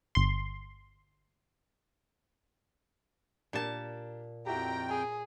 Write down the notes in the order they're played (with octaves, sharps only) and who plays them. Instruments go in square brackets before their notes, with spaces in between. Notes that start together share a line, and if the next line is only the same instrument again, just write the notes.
[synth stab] G1 C6
[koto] A#2 A5 [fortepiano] D4 G4 A#4
[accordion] F2 G5 [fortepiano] E4 F#4 G4 [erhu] A#5
[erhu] G#4 [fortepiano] A#5